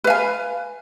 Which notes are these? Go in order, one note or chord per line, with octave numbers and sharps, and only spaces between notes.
B4 F5 G#5